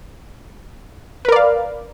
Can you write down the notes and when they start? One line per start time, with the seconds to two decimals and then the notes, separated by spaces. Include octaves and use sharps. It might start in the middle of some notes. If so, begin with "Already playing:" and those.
1.25 B4
1.29 A#4
1.32 D5
1.36 F5